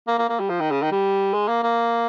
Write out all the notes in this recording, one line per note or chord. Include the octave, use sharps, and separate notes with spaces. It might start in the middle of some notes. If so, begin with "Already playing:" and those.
A#3
A#3
A#3
G3
F3
D#3
C#3
D#3
G3
G#3
A#3
A#3